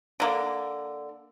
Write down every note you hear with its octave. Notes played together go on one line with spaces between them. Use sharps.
D3 A#3